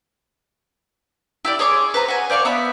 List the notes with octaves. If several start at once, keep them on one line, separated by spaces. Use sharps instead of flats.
E4 G4 D5
G#4 C#5 C6 D6
B4 C5 A#5
F#4 G#5
C5 D5 F5 C#6
B3 E5 B5